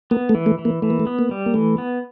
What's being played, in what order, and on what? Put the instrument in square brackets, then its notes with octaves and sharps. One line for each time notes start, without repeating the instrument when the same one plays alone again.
[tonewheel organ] A#3 [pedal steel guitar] B3
[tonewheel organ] A3
[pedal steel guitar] E3
[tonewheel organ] A3
[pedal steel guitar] E3
[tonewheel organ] A#3
[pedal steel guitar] E3 [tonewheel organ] A3
[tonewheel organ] A#3
A3
[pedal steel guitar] B3
[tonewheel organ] A#3
[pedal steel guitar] G3
[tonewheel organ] A#3
[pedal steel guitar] E3 [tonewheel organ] A3
[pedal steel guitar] B3